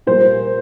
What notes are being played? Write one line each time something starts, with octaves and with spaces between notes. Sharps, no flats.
A#2 G3 A#3 C5